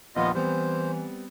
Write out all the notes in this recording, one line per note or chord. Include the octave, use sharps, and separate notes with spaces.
A#1 D#2 F3 B3 F4 D#5
E3 G3 B3 C4 C5